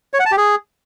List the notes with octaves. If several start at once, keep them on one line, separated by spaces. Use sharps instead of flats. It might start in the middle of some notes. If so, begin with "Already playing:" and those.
C#5
F#5
A5
G4
G#4